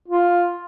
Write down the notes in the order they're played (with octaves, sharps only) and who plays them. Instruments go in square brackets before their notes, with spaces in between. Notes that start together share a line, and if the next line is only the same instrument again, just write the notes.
[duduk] F4